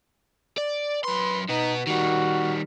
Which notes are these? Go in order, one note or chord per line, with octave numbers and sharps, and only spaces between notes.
D5
F#2 B4 C6
B2 B3 D#4
D#3 G3 F#4